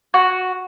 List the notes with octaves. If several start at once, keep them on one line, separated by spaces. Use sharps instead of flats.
F#4